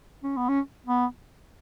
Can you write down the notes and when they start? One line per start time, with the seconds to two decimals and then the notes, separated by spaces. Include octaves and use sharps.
0.24 C#4
0.37 B3
0.49 C#4
0.87 B3